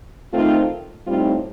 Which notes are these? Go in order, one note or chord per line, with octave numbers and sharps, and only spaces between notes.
D#3 A3 C4 D#4 F4
A2 G3 C4 D#4 F4